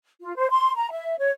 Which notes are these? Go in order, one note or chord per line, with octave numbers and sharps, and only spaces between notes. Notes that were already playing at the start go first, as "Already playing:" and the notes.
F4
C5
C6
A#5
E5
C#5